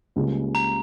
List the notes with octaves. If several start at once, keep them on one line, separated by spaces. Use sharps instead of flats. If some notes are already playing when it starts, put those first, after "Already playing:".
C#2 C#3 G3 A#3
A#5